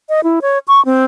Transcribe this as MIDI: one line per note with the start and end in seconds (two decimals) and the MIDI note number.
0.09 0.20 75
0.24 0.39 64
0.42 0.58 73
0.68 0.83 85
0.85 1.05 60